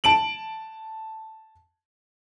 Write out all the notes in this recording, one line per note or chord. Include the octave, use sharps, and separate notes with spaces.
A5 D7 F#7